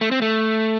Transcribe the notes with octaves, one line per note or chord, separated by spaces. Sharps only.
A3
C4
A3